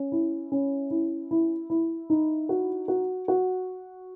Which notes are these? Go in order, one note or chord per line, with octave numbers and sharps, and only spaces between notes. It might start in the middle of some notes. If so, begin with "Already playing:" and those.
Already playing: C#4
E4
C#4
E4
E4
E4
D#4
F#4
F#4
F#4